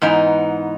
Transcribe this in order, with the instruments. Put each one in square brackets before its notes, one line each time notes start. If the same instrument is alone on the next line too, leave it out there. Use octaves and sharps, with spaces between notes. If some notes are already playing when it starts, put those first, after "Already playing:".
[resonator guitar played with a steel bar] G#2 E3 B3 D#4